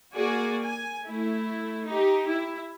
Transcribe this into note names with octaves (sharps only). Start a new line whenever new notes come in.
A#3 F#4 G#4 D5 G#5
G#5
A3 E4
D#4 G4
E4